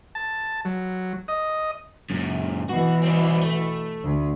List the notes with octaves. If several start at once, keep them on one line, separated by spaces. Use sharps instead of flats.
A5
F#3
D#5
F#2 A#2
B2 E3 F#4
C4 D5
A3
D2